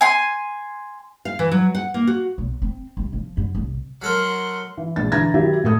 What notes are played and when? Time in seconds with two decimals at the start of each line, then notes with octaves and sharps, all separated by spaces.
0.01 G#5 C6
1.25 F5
1.39 E3
1.52 F#3
1.75 F#5
1.94 A#3
2.07 F#4
2.38 B1
2.62 C4
2.97 C2
3.13 F3
3.37 F#2
3.55 C2
4.02 F#3 A4 A#4 F#5 C6
4.78 E3
4.96 A#1 A6
5.12 D3 E3 A#5 G#6 A#6
5.34 D#3 F#3 E4 G4
5.64 A2 A4 D#6 G#6